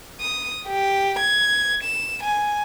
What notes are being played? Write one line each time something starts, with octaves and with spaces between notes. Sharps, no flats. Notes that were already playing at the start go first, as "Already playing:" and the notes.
D#6
G4
G#6
E7
G#5